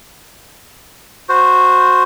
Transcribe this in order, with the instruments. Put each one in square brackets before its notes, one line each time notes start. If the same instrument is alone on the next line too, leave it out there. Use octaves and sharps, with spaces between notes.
[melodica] F#4 C5